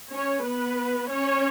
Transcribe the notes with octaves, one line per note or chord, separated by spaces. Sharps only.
C#4 C#5
B3 B4
C#4 C#5